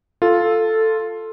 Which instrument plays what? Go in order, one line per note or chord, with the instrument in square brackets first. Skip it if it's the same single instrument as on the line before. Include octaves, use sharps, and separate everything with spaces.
[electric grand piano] F4 [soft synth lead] A4